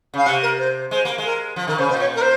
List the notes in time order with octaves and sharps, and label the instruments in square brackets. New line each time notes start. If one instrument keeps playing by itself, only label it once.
[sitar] C#3 [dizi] F5
[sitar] C3 [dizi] F#5
[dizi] A#4
C5
[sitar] G#3 [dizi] C5
[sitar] A#3
G#3
[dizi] A#4
[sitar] F3
[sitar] D#3 [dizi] A#4
[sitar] C#3 [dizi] C5
[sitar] A#2 [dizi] C5
[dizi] C#5
A#4
C5